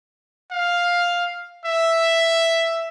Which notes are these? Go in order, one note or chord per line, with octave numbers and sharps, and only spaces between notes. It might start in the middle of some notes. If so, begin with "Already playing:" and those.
F5
E5